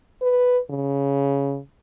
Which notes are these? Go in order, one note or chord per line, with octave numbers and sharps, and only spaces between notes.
B4
C#3